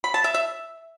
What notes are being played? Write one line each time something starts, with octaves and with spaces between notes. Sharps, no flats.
B5
A5
E5
E5